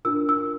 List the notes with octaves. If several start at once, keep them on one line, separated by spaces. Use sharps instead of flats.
D4 F4 A#4 E6
E6